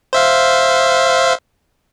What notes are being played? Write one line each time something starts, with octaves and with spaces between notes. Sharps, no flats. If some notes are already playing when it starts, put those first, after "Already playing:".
C5 E5 F5